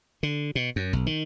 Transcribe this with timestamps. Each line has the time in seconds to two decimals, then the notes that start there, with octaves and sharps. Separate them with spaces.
0.23 D3
0.55 B2
0.76 F#2
0.93 B1
1.06 D#3